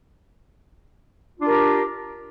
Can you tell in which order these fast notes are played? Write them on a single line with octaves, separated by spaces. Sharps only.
F4 D4 G4 A#4